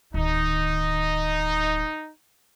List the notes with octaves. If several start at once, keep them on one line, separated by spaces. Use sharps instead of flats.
D1 D#3 D#4